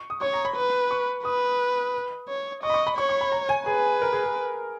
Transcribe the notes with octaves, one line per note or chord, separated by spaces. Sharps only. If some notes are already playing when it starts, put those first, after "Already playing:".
Already playing: C#6
D#6
C#5 C#6
A#5
B5
B4
C#6
B4 D#6
C#5
D#5 C#6
B5
C#6
B5
C#5 C#6
C#6
B5
A#5
G#5
G#4 B4
A#4
G#4
G#4